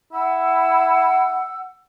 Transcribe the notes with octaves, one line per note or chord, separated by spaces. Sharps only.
E4 F#5 E6